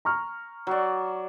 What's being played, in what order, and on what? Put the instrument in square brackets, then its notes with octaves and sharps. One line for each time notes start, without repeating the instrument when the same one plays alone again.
[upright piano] A#5 C#6 F6
[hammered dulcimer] F#3 D5